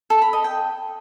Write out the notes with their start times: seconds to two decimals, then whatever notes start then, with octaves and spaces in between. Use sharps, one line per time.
0.10 A4
0.22 B5
0.33 D#5
0.44 G5